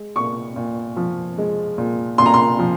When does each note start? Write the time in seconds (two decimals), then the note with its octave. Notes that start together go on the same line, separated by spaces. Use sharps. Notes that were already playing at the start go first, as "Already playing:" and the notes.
Already playing: G#3
0.16 A#2 C#6
0.56 A#2
0.97 F3
1.38 G#3
1.78 A#2
2.18 A#2 C6
2.26 A#5
2.34 C6
2.59 F3